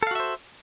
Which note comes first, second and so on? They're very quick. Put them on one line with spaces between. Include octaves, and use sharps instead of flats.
A4 F5 F#4 E5 C5